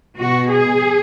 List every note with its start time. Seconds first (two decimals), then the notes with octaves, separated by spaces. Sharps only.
0.17 B2 F#4
0.51 G#4